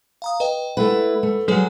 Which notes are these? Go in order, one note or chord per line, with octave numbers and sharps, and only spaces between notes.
F5 A#5 D#6
B4 D#5 G5
A3 E4 B4 F#5
A3
F#3 G3 G#4 B4 C#5